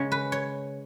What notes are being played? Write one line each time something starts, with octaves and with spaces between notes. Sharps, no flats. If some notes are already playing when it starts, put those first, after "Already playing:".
Already playing: C#3 G#3 C#4 C#5
B4
C#5